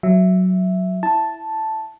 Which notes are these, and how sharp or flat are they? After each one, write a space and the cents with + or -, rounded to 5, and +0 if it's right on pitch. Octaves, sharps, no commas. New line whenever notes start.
F#3 +0 E5 +0
E4 +0 A5 +0